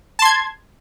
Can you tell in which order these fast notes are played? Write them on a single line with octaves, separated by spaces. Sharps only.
A5 C6 G#6